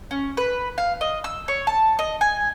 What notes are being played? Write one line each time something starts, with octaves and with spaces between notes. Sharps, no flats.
C#4
B4
F5
D#5
E6
C#5
A5
D#5
G#5